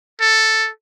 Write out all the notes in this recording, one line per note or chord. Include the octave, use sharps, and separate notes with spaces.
A4